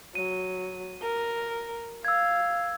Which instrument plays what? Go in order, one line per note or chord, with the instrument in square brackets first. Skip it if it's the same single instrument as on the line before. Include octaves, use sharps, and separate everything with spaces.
[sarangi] F#3 [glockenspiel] D#7
[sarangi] A#4
[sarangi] F5 [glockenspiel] E6 G#6